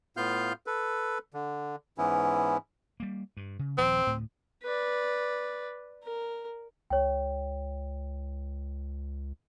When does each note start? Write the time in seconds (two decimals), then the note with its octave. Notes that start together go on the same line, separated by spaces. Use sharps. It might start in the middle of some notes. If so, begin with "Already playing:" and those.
0.17 A2 B3 F4 F5 F6 G6
0.67 A4 B4
1.34 D3
1.98 G#2 E3 B3 C#4 E4
3.00 G3 A#3
3.37 G2
3.59 C#3
3.78 D#1 F3 C4
4.07 D2 A2
4.63 B4 D5
6.04 A#4
6.90 C#2 C#5 G5